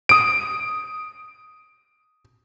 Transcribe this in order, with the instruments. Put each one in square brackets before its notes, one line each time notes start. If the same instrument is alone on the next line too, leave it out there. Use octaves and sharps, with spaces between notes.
[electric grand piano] D#6 D7